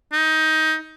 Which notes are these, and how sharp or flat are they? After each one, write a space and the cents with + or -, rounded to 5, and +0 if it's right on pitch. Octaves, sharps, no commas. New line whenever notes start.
D#4 +15